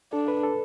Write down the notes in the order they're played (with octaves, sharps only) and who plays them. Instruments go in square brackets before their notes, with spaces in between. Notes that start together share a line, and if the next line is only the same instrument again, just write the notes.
[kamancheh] D4 [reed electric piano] A4
[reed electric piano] B4
A4